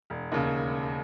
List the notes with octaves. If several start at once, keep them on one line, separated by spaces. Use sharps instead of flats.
E1
D#2 C#3